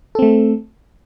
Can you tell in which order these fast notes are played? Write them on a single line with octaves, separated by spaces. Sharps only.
A4 C4 A3